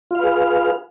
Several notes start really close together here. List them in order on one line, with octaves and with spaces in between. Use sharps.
F4 F5 B4 G#4